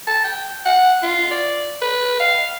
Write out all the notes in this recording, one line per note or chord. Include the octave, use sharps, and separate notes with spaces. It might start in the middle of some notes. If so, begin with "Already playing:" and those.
A5
G5
F#5
F4
D5
B4
F5